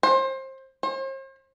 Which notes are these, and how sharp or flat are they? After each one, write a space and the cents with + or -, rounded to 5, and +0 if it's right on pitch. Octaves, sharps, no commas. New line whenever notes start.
C5 +25
C5 +45